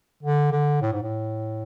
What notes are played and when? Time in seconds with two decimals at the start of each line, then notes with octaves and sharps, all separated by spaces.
0.23 D3
0.52 D3
0.82 A2
0.93 G#2
1.03 A2